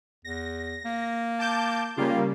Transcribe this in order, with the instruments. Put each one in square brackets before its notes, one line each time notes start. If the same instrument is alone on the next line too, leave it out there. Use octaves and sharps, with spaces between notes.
[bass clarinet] E2 [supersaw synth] A#6
[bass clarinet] A#3
[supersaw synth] A5 D6 G6
[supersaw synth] C#3 G3 A#3 [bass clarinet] F4